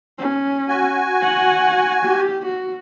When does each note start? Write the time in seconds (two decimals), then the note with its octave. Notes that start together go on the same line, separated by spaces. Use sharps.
0.19 C#4
0.68 F#4 G#5
1.23 F#5
2.04 G4
2.46 F#4